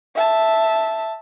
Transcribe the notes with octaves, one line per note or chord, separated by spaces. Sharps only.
E5 A5